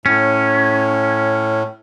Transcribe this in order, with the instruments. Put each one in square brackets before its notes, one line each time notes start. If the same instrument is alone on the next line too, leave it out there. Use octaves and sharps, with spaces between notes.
[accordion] A2 [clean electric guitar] C#4